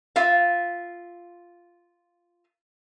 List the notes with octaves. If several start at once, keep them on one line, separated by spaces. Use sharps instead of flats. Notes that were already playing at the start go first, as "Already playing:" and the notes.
F4 E5 F5